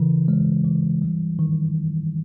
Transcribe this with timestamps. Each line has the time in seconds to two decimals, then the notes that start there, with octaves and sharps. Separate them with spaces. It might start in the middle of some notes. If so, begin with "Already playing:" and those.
Already playing: C#3 E3
0.28 G#3
0.65 E3
1.02 G3
1.39 D#3